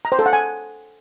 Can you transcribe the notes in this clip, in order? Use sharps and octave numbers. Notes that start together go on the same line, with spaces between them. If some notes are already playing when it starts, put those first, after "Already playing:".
A#5
C5
A4
F#5
G#5